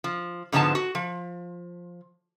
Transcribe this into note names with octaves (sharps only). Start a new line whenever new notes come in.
F3
G#2 D3 F3 G#3 B3 A5
F#4
F3